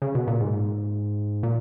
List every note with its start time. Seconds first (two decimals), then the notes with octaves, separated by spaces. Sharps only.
0.02 C#3
0.15 B2
0.27 A#2
0.40 G#2
1.43 A#2